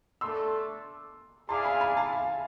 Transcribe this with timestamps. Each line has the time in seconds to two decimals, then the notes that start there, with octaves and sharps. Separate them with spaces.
0.21 A3 D4 A4 C6 E6
1.49 E4 G#4 D5 F5 A5 C6
1.65 G#5 B5
1.81 G#5 B5
1.97 F5 A5
2.12 E5 G#5